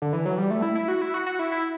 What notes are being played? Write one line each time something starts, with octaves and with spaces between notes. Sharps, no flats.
D3
E3
F#3
G3
A3
E4
E4
F#4
E4
F#4
F#4
E4
E4